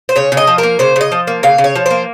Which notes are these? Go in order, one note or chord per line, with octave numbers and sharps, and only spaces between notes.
C5
C#3 C#5
C#3
D#5
F3
A#3 A#4
C#3 C5
C#3 D#5
F3
A#3
C#3 F5
C#3
C#5
F3
A#3 C5